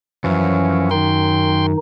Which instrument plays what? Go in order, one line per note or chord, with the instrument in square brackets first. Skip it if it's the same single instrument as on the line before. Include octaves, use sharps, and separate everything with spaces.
[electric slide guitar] F#2 [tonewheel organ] E3 F3 C#4
[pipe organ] D#3 D#4 [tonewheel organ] G5 C6